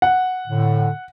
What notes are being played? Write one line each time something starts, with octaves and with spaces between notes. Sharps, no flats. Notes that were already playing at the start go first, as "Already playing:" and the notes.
F#5
A2 D3